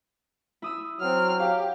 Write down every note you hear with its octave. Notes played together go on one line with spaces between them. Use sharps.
E4 D#6 E6
F#3 C4 F6
G4 F5